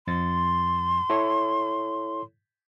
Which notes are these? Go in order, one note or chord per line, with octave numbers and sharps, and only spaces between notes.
F2 C6 A6
E4 A4 C#5